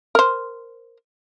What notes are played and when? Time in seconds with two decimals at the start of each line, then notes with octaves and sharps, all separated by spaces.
0.15 A#4 C5